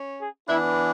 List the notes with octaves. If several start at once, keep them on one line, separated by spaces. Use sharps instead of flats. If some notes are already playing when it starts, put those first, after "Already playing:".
Already playing: C#4
G#4
E3 B3 D4 E4